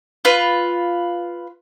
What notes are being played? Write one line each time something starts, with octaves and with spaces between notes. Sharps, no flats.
F4 B4